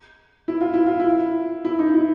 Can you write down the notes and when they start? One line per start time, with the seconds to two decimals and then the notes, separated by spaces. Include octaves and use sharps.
0.48 E4
0.61 F4
0.74 E4
0.86 F4
1.00 E4
1.65 E4
1.79 D#4
1.94 E4